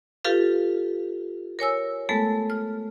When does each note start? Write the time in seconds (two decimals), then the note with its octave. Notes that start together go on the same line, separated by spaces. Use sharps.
0.25 F4 G4 A4 B4 F5
1.59 A#4 C#5 G#5 E6
2.09 G#3 A3 B3 A4
2.50 F6